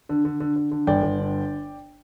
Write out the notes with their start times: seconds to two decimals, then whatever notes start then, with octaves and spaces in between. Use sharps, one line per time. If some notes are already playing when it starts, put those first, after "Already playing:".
0.09 D3
0.25 D3
0.40 D3
0.56 D3
0.71 D3
0.87 G1 D5 G5
1.03 G1
1.19 D3